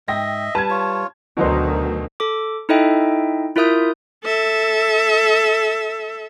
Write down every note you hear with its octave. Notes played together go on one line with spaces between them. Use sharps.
G#2 D#5 E5 G5 A#6
G3 B4 A5 G#6
F4 C#5
D2 B2 D#3 F#3 C5
A4 D6
D#4 E4 A4 D#5 E5 G5
E4 F4 A#4 E5 D#6 G6
A4 E5